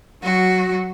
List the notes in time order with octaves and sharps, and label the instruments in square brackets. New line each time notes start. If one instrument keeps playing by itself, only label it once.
[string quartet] F#3 F#4